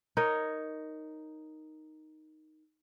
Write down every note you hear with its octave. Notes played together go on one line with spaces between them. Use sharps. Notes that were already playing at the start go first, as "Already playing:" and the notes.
D#4 A#4 C#5 D#5